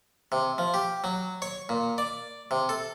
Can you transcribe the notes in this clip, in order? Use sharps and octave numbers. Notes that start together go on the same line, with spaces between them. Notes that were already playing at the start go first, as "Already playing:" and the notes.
C3
F3
G4
F#3
C#5
A#2
D5
C3
A4